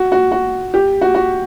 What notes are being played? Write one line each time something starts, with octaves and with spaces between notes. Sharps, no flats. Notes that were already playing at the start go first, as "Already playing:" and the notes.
Already playing: F#4
F#4
F#4
G4
F#4
F#4